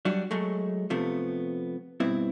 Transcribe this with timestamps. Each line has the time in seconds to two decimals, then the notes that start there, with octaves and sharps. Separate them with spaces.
0.05 F#3 G3 D4 F#4
0.31 F#3 G#3 A3
0.90 C3 F3 A3 B3
2.00 G2 B2 C4 E4